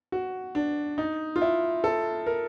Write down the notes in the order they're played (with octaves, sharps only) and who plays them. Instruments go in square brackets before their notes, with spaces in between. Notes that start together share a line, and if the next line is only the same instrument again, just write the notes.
[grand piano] F#4
D4
D#4
F4
E4
A4
A#4